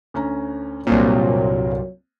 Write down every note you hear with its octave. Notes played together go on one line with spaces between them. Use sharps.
D2 C#4 A#5
C2 G2 A#2 F#3 A#3 C4 C#5